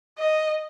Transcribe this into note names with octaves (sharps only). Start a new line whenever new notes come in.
D#5